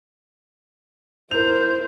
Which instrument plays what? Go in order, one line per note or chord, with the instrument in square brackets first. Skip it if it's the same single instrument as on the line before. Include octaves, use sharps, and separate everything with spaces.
[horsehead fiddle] E4 C5 [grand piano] A#4 F7 [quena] G6